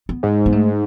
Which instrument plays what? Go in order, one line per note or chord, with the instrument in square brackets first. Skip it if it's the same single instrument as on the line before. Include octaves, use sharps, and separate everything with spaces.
[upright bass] B3
[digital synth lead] G#2
[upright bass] B3
A3